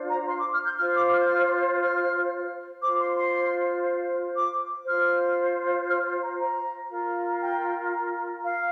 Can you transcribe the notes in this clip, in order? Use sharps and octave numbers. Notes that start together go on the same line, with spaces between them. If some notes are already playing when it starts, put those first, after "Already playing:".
Already playing: D4 F4 C5
A#5
C6
D6
F6
G6
F4 C5 F6
D6
F6
G6
F6
F6
F4 C5 D6
C6
C6
D6
F4 C5 F6
F6
C6
A#5
A#5
F4 A#4
G5
F5